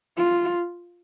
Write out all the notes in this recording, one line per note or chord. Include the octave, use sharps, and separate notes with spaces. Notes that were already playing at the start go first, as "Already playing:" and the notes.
F4